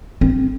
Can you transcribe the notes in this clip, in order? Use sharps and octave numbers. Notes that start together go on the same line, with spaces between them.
C4